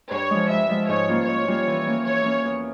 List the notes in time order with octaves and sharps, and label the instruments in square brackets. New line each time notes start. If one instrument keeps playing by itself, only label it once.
[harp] G2 [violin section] C#5
[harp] F3 G#3
[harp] G2 [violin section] E5
[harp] F3 G#3
[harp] G#2 [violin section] C#5
[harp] G3 A#3 C#4 F4
[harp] G#2 [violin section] C#5
[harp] G3 A#3 C#4 F4
E3
A#3 C#4
[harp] E3 [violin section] C#5
[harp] A#3 C#4
E2